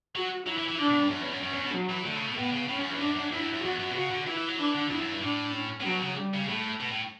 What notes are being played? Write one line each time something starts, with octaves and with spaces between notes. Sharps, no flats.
F#3 F#4
F#3 E4
E3
E3
D3 D4
B2
G2
F#2 C#4
E2
F#2
F#2 C#4
E2
B2
F#3
E3
D3 A3
C#3
B2
A2 B3
C#3
A2 C#4
F#2
E2
F#2 D4
F#2
E2 E4
F#2
F#2
E2 F#4
F#2
B2
C#3 F#4
D3
E3 E4
E3
F#3
E3 D4
D3
E2 E4
F#2
G2
A2 D4
C#4
A2
B2 F#3
C#3
G3
C#3
A2 A3
B2
A2